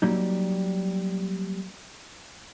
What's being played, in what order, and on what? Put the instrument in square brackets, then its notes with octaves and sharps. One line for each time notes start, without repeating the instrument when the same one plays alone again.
[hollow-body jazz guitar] F#3 G3 A#3 D#4